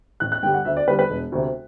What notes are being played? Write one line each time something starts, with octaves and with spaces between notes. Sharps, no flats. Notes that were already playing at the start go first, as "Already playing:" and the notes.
A1 F#6
F#6
G2 D3 G3 G5
F#5
D2 E5
D5
D3 G3 B4
B4
E1
D2 C3